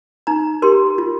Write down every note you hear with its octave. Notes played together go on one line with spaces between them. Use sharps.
D#4 A#5
G4 A#4 C6
F4